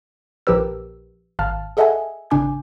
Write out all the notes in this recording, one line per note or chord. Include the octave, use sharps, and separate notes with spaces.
A#1 F3 G4 A#4 B4 E6
G#1 F5 A5 F6
G#4 A4 D#5 E5 F#5 G#5
G#1 C#3 D4 G#5 D6 G6